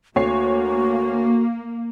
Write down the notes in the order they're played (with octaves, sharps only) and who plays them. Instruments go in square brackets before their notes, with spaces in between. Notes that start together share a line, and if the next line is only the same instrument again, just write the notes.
[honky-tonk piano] D2 C#5 C7 [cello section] A#3 [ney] F#4